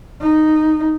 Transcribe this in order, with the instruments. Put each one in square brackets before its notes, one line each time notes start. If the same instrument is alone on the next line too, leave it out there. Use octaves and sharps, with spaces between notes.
[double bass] D#4